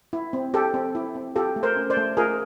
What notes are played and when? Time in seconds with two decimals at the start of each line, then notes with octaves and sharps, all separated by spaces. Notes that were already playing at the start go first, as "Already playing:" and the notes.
0.13 E4
0.33 C4
0.54 G4 A4
0.74 C4
0.95 E4
1.15 C4
1.35 F4 G4 A4
1.56 A3
1.63 A#4 C5
1.76 C#4
1.90 C5 D5
1.97 A3
2.17 F4 G#4 A#4